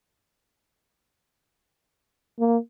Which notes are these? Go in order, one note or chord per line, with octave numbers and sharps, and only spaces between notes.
A#3